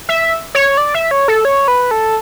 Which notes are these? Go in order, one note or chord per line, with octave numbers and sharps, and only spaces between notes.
E5
C#5
D5
E5
C#5
A4
C#5
B4
A4